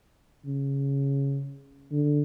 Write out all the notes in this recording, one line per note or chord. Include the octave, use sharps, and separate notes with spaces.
C#3
D3